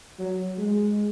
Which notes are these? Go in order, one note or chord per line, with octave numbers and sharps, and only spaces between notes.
F#3
G#3